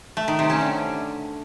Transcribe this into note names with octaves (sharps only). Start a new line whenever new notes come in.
A3
D#3
C3
C#4
D3